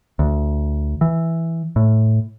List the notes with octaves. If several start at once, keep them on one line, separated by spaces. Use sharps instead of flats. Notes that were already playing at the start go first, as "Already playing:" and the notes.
D2
E3
A2